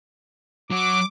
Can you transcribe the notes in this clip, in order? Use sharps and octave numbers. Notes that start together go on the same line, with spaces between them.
F#3 F#4 D6